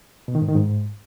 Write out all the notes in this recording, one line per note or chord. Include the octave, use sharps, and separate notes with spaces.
B2
D#3
G#2
D#3
G#2